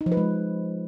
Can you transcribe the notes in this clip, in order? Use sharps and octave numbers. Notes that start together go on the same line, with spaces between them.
D#4
F3
B4
G#3